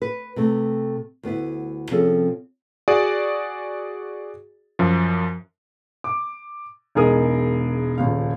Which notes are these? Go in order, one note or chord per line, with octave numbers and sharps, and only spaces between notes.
B4
C3 A3
D2 B3 E4
C3 F3 C4 C#4 G#4 A4
F#4 G#4 D5
F#2 F3
D6
E1 G#3 D#4 G#4 A#4 D#6
D#1 C#2 F5